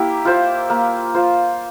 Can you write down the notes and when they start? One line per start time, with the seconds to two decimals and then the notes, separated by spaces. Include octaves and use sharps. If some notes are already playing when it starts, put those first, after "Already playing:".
Already playing: A#3 E4 G4
0.25 F4 C5 F5
0.70 A#3
1.15 F4 C5 F5